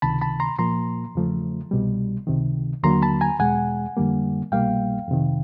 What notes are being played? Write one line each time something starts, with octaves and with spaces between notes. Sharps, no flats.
C#2 C3 D#3 A5 B5
A5 B5
A#5 C6
A#2 F3 A#3 A#5 C6
E2 C#3 F3 A3
C2 B2 G3
C#2 C3 D#3
D#2 D3 F#3 A#3 A#5 C6
A5 B5
G#5 A#5
E2 B2 G#3 F#5 G#5
F2 D3 G3 A#3
C2 B2 G3 A#3 F5 G5
F2 C3 D#3